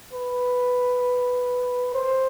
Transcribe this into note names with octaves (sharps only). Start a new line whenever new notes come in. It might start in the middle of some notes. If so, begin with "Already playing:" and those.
B4
C5